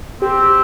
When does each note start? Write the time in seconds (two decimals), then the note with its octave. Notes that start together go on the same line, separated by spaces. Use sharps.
0.22 C4 G4